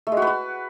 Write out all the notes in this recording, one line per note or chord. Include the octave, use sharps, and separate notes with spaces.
A3
G#3
F#4
B4
F#4